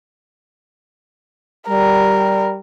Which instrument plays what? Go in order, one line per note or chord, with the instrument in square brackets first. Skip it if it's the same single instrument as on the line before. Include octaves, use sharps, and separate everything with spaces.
[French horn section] G3 [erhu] A#4